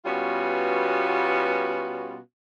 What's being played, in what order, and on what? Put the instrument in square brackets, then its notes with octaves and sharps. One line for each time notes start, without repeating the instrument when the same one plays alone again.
[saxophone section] B2 G3 B3 C#4 F4 F#4